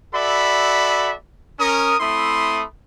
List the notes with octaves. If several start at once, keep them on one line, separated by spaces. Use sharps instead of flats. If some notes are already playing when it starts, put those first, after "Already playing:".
F#4 A4 D5 E5 B5
C#4 A#4 D#6
A3 C4 E4 B5 C6 D#6